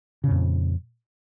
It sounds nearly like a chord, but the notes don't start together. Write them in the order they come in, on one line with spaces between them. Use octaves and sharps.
C#3 A#2 F2